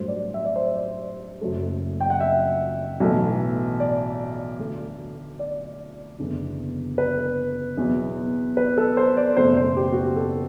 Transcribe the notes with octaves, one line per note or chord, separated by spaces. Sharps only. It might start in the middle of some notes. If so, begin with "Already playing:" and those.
Already playing: A1 G2 F#3 A3 C5
D5
E5
D5
C5
D5
F#1 F#2 F#3 A3
G5
F#5
E5
B1 A2 E3 A3
D5
D2 D3 A3
D5
F#1 E2 D3
B4
E2 B2 F#3
B4
A4
C5
D5
F#1 E2 B2 A3 C5
C5
G4
F#4
G4
A4